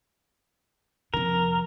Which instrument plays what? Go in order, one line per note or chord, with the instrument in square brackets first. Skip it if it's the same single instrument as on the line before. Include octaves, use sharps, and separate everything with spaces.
[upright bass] F2 C3 [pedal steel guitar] A#4